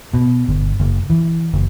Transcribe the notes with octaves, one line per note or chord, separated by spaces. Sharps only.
B2
G1
F#1
E3
F#1